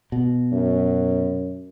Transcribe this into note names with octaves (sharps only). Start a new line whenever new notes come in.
B2
F#2